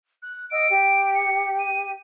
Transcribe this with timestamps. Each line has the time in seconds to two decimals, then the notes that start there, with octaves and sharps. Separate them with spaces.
0.23 F#6
0.50 D#5 F#5 E6 D7
0.69 G4
1.15 C#7
1.59 D#7